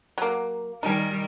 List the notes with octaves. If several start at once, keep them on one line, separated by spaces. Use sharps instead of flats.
F#3 A#3
D#3 G3 D#4 A#4 G#5